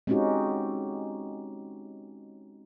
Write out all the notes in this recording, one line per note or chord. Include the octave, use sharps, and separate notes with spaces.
G#3 C4 C#4 D#4 F#4 G4